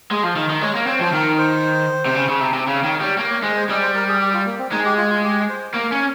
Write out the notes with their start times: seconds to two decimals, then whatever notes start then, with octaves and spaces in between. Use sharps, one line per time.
0.11 G#3 G#4
0.23 F3
0.36 D#3 D#5
0.50 D#3
0.61 G#3 C#5
0.75 A#3
0.87 C4 C#5
1.01 F3 C5
1.13 D#3 A#4
1.38 C5
2.06 C3
2.15 C#3
2.29 C#3
2.41 C3
2.54 C3
2.67 C#3 C#5
2.84 D#3 C#5
3.01 G3 C#5
3.18 A#3 C#5
3.31 C#5
3.43 G#3 C5
3.56 C5
3.69 G3 D#5
3.82 C5
3.95 A#4
4.08 G#4
4.21 G4
4.33 F4
4.46 A#3
4.59 C4
4.72 G#3 D#4
4.85 G4
4.98 F4
5.10 F4
5.24 G4
5.49 C5
5.74 A#3 A#4
5.92 C#4 A#4